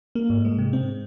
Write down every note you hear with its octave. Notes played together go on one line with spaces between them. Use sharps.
A#3
G#2
G#3
C3
C4